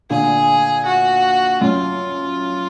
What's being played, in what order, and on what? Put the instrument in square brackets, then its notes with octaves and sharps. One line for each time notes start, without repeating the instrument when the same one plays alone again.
[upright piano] A#2 D3 [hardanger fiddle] G#4
[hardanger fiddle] F#4
[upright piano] F#2 [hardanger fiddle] F4